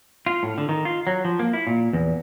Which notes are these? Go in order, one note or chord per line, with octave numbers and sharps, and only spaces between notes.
F4
A2
D3
D#3
F4
F#3
F3
A#3
E4
A#2
E2